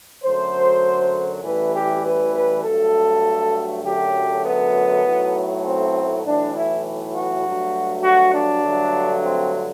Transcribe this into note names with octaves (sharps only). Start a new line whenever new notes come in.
F#2 D3 F#3 A3 C5
A1 A2 E3 G3 B4
G4
B4
B4
G2 F#3 A3 A4
F#2 D3 F#3 A3 G4
B3
B1 A2 F#3 A3
C4
B1 A2 E3 D4
E4
F#4
G2 F#3 A3
F#4
D4
G2 D3 F#3 A3
C4